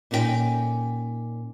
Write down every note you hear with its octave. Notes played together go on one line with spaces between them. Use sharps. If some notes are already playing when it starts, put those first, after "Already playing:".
A#2 C#4 D#4 F#4 G5 G#5